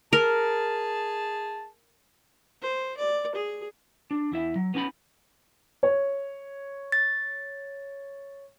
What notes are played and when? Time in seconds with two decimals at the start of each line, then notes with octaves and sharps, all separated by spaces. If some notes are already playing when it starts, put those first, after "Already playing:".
0.13 G#4 A#4 A5
2.62 C5
2.97 D5
3.35 G#4
4.11 D4
4.32 E2 E4 E5
4.56 F#3
4.74 B3 C#4 D#4 A5 B5
5.83 C#5
6.92 A6